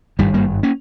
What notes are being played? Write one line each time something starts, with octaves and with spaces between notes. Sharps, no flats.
G#1 G2 D#3 G3
G3 A#3
A#3 C#4